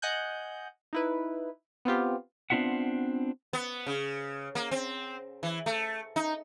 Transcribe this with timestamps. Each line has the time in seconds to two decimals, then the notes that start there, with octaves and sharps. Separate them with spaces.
0.02 D#5 F#5 G#5 F#6 G6
0.93 D#4 E4 B4
1.85 B3 C4 F4 G4
2.50 B3 C4 D4 F4 E5 F#5
3.53 B3
3.86 C#3
4.55 A#3
4.71 C4
5.43 E3
5.66 A3
6.16 D#4